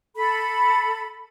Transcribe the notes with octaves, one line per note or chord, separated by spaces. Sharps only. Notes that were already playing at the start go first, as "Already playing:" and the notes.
A4 B5